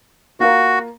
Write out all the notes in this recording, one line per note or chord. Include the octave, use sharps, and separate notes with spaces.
A#3 F4 F#4 A#4